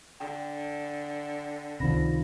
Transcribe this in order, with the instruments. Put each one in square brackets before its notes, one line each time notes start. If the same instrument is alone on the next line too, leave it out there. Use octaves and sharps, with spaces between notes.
[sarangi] D3 [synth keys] G5
[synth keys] C#2 B5 A#6 [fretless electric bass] C3 D#3 F3